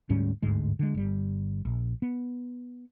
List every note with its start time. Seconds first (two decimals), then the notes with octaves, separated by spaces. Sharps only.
0.10 D2 G#2 G3 C#4
0.42 G1 D2 G#2 G#3
0.79 D3 G#3
0.94 G1 G3
1.65 A#1
2.02 B3